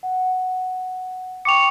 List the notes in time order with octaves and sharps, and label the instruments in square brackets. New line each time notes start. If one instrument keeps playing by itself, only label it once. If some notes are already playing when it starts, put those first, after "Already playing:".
[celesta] F#5
[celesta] G5 C#6 D6 [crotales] C#7 F7